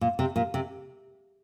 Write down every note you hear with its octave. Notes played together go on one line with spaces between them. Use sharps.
A#2
C3
A#2
C3